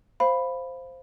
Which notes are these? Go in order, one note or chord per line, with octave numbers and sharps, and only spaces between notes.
C5 F5 B5